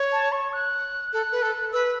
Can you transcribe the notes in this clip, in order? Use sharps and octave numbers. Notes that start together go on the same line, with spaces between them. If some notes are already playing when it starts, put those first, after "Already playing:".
Already playing: C#5
A5
C#6
F#6
A4 F#6
B4
A4
B4 E6